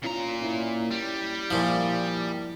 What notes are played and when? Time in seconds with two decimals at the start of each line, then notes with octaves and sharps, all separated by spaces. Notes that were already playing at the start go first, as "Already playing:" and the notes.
0.03 A#2 C#4 D4 F4 A#5
0.41 C#4 E4
0.91 G3
1.51 A#2 F3 E4